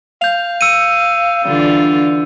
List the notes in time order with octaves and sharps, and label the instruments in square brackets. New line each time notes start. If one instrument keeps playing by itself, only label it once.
[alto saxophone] F5 [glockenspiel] G6 F7
[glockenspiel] E6 C#7 D#7
[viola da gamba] D3 E3 F4 [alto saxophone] G3